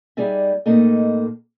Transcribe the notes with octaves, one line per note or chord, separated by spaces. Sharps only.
G3 D#4 G#4 D5 E5
A2 A#3 C4 D#4 A4 D#5